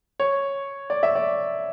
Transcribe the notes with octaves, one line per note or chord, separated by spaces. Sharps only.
C#5
D5
E5
D5